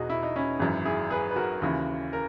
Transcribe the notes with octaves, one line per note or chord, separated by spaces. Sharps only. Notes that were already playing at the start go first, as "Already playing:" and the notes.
Already playing: E1 E2 B2 D#4 F#4 G#4
E4
D#4
C#4 E4
G#1 F#2 E3
E4 G#4
G#4 B4
B4
F#4 A#4
D#2 C#3 E3
A#4